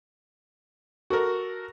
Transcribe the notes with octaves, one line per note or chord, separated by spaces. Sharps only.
F#4 A4 A#4